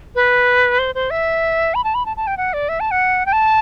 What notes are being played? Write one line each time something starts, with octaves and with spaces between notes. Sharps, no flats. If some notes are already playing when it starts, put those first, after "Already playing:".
B4
C5
C5
E5
B5
A5
B5
A5
A5
G5
F#5
D5
E5
A5
F#5
G5
A5